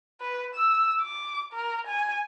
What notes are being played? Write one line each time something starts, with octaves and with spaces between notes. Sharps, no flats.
B4
E6
D6
A#4
G#5